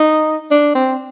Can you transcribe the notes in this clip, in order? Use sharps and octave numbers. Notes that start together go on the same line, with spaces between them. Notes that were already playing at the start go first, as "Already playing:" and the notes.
Already playing: D#4
D4
C4